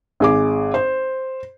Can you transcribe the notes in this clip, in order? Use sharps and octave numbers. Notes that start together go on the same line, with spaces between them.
G#1 G#4 D6
C5